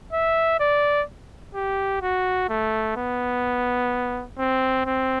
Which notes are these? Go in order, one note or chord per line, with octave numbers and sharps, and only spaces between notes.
E5
D5
G4
F#4
A3
B3
C4
C4